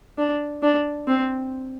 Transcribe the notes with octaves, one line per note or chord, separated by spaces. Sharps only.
D4
D4
C4